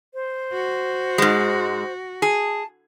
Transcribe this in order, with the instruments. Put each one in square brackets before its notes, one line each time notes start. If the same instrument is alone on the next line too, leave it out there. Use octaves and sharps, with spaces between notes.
[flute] C5
[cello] F#4
[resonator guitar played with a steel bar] G#2 G#3
[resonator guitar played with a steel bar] G#4 [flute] A5